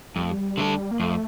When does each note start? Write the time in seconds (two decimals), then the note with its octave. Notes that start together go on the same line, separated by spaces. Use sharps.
0.16 F2 G3
0.23 A3
0.31 G3
0.57 D3 A3 D4 A4
0.91 A#3
1.00 F2 A3